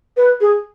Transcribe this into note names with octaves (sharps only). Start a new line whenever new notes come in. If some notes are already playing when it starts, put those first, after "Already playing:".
B4
G#4